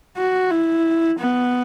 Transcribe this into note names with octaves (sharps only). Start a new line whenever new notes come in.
F#4
E4
B3